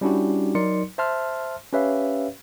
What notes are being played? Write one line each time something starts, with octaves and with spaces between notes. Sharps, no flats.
G3 C#4 D4 E4 F#4 G4
F#3 D#4 A#4 D5 C6 C#7
C5 E5 A5 C6 F6
C#4 G4 B4 C#5 E5 F5